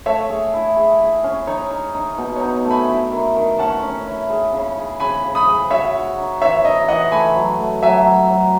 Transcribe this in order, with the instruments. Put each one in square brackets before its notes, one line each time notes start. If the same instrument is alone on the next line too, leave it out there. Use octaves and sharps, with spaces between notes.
[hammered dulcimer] A3 [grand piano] C#5 E5
[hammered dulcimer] G#4
E4
G#4
G#4
C#4
[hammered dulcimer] D#4 [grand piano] C#5
[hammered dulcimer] D#4
D#4
B2
[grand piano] C#5
[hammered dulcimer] D#4
A3
[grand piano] G#5 B5
[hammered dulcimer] E4
D#3
D#3
[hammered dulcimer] C#4 [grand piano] F#5 A5
[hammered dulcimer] C#4
E4
G#4
C#3
G#4
[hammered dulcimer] C#3 [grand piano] G#5 B5
[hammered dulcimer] C#3
[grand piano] B5 D#6
[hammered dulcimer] G#4
[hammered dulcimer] F#4 [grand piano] C#5 E5
[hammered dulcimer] F#4
D#4
[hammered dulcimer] E3 [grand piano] C#5 E5
[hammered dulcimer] D#4 [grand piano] D#5
[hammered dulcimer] E3 [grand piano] D#5 F#5
[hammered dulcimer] A3 [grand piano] G#5 B5
[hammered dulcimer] F#3
A3
[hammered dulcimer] F#3 [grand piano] E5 G#5
[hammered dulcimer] F#3
F#3